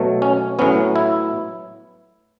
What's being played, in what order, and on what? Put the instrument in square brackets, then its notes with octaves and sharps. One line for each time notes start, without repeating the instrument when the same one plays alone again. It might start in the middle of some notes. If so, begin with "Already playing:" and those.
Already playing: [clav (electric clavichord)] B2 F#3 A3
C#4
A2 F#3 B3 C#4
E4